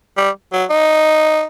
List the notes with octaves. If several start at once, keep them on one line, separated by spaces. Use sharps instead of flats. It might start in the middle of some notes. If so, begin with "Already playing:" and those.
G3
F#3
D#4